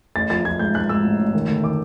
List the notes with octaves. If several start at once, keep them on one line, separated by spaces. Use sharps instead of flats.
A1 A6
F3 A6
F3 G#6
G#2 G6
G#2 F#6
G#2 E6
A1
A1
D#3
D2
D#3 D6